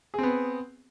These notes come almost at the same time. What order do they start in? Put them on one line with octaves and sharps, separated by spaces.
G#4 C4 B3